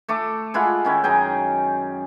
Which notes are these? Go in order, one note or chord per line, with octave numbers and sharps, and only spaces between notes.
A3 A4 D6
G#3 E4 F4 F#5
D#3 C#4 E4
F#2 D#4 G#4 G5